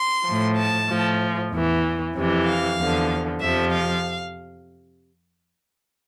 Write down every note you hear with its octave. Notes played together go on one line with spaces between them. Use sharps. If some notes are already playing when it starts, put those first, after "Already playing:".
Already playing: C6
A2 F3
A5
A2 F3
E2 E3
F2 C3 E3
F5
E2 D3 F3
F2 C3 F3 E5
F5